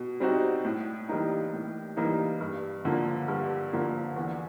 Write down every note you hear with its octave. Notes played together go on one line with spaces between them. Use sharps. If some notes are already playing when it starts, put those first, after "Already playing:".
Already playing: B2
G3 C4 D#4 F#4
A2
E3 G3 A#3 D#4
A2
E3 G3 A#3 D#4
G2
D3 F3 A#3
G2
D3 F3 A#3
E2